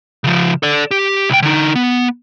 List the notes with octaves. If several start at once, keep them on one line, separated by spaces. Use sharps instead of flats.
C#3 F3
A4 D5
G4
C2 G5
D3 D#4
B3